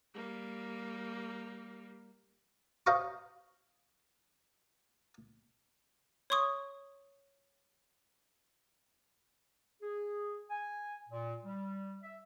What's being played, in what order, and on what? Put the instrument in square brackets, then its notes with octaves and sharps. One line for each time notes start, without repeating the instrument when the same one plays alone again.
[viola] G3 A#3
[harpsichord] C5 D#5 F5 A#5 C#6
[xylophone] C#5 C6 C#6 D#6
[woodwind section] G#4
G#5
A#2
G3
E5